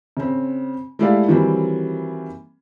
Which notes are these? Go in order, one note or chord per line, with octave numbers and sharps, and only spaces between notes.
C#3 C4
G#3 A3 E4 G4 D5 F5
D#3 E3 F#3 G3 A#3 C4